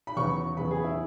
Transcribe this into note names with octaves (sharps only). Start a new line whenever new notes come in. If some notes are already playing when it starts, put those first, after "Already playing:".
B5
E2 C#3 F#3 B3 C#6
E2 C#3 F#3 B3 B5
G#4
E4